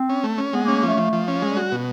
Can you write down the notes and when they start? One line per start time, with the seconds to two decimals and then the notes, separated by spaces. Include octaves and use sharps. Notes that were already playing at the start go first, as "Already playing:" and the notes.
Already playing: C4
0.09 C#4
0.24 A3
0.38 C#4
0.53 G#3 B3
0.64 A#3
0.68 C#4
0.76 A#3
0.83 F3 A3
0.97 F3
1.13 F3
1.28 C#4
1.42 G3 G#3
1.57 F#4
1.72 B2